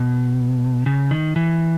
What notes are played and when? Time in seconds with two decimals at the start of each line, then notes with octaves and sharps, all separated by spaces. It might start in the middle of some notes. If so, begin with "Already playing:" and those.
Already playing: B2
0.86 C#3
1.11 D#3
1.36 E3